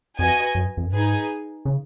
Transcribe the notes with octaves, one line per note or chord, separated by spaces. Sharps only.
F2 F#4 B4 D#5 G#5
F#2
F2
F#2
G#2 D#4 G#4 B4
C#3